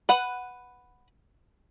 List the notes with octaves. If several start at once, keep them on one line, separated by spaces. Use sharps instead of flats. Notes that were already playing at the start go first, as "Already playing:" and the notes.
B4 F#5